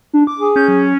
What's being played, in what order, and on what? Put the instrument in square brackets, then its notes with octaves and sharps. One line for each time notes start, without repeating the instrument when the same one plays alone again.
[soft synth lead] D4
D6
[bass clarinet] G#4
[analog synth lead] C#4 [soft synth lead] G6
[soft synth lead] F#3